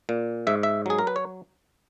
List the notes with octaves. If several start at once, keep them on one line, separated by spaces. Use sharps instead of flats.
A#2
G#2 E5
E5
F#3 G#4
A#4
B4
C#5